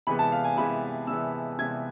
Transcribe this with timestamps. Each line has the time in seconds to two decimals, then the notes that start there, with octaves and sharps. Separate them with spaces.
0.07 C3 E3 G#3 B3 B5
0.19 A5
0.32 F5
0.44 G#5
0.57 C3 E3 G#3 B3 B5
1.07 C3 E3 G#3 B3 E6
1.58 C3 E3 G#3 B3 G#6